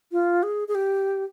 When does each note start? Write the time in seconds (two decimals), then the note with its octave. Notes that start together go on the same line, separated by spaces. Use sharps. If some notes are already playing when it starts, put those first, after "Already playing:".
0.12 F4
0.43 G#4
0.68 G#4
0.75 G4